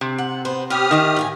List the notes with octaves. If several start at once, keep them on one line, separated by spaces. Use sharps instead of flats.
C3
F#5
B3 C5
B3 G4 C#5 D#6 F6
D#3 D#4 E5
A2 F5 G#5